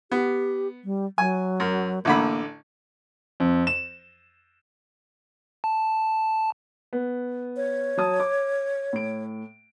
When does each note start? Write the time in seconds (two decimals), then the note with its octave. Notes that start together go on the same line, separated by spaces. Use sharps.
0.12 B3 G4
0.84 G3
1.18 F#3 G#5
1.60 F#2
2.05 A1 D3 A#3 B5
3.40 F2
3.67 E7
5.64 A5
6.93 B3
7.57 C#5
7.97 F#3 A5 D#6
8.20 D6
8.93 A2 D7